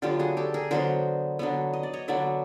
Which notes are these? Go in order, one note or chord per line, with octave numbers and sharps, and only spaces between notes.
D3 F#3 B3 F4 G4
F#4 G#4
G4 A4
G#4 A#4
D3 F#3 B3 A#4 C5
D3 F#3 B3
D#5
D5
C#5 D#5
D3 F#3 B3 D5 E5